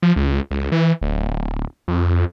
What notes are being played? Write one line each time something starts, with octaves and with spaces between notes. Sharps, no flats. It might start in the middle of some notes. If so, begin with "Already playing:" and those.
F3
C#2
C#2
E3
D1
F2